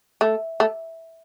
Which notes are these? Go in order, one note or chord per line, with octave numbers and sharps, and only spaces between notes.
A3
A3